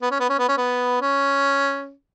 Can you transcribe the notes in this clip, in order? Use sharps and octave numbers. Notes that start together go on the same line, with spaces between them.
B3
C#4
B3
C#4
B3
C#4
B3
C#4